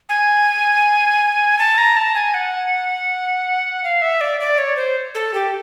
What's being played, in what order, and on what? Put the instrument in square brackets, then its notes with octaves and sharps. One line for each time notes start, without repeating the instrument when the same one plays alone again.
[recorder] G#5
A5
A#5
A5
G#5
F#5
F5
E5
D5
D5
C#5
C5
A4
G4